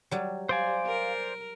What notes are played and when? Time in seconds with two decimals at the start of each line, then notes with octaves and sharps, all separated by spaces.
0.11 F#3 G3
0.49 C5 D5 F5 G#5
0.86 A#4